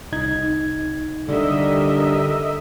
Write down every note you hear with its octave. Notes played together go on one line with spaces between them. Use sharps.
C2 D#4 G#6
D3 G3 A#4 D#5 E5